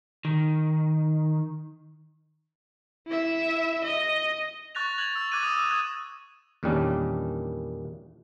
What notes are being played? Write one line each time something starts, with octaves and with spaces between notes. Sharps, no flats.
D#3
E4 E5
D#5
C#6 F#6 A6 A#6 F7
F#6 G#6 F7 F#7
E6
D6 F#6 G#6 D#7
D#6 E6 F7
D#6 F#6 G#6 E7
E2 A#2 D#3 G3 C#4 D4